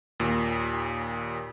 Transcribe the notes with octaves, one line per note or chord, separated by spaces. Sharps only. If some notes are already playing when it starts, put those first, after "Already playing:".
D#2 A#2